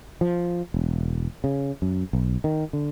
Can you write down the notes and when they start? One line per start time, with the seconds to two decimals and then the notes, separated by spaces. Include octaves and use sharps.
0.21 F3
0.74 E1
1.44 C#3
1.82 F#2
2.13 B1
2.44 D#3
2.73 D3